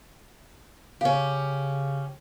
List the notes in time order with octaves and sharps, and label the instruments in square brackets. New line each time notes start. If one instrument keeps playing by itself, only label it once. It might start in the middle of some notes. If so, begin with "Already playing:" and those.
[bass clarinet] C#3 [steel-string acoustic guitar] C#4 G4 [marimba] F5